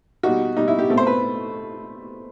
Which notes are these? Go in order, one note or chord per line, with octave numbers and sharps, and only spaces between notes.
B2 G3 D#4 F#4
B2 G3 D#4
E4
G4
B2 A3 C4
C5
B4